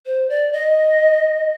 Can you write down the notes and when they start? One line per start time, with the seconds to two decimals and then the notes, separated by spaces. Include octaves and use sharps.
0.06 C5
0.29 D5
0.53 D#5